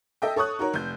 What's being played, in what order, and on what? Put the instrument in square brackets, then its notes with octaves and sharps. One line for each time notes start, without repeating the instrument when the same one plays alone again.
[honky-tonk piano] A4 D#5 E5 G5
A4 C#5 C#6 D#6 F#6
D#4 F#4 A#4 C#5
F1 G6